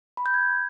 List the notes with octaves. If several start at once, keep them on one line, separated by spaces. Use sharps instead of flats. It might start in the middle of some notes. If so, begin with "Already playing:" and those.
B5
G6
G#6